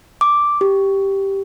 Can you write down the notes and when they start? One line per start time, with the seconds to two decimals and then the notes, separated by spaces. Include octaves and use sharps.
0.21 D6
0.61 G4